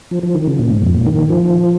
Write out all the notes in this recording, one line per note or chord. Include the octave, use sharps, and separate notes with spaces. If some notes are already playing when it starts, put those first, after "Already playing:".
F3
F3
D#3
C#3
A#2
G#2
F2
A#2
D#3
F3